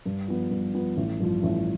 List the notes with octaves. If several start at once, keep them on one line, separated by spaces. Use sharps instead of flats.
G2
F3 B3
G2
F3 B3
A1
G2 F3
A1